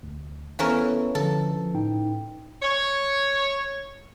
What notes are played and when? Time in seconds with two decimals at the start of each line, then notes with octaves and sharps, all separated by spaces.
0.03 D2
0.59 E3 B3 C#4 A4 A#4 F5
1.15 D3 F3 A4
1.57 F3
1.74 A2 D#4 G5
2.62 C#5